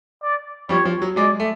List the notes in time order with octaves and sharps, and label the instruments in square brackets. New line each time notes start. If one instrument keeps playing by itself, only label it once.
[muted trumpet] D5
[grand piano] F3 G3 [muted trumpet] C#5
[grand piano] F3
F#3
[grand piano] F#3 G#3 [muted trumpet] D5
[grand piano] A3